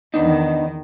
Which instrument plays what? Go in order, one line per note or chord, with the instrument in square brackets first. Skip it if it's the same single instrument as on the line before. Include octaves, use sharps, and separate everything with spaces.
[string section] E2 D#3 [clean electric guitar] B3 D4 D#4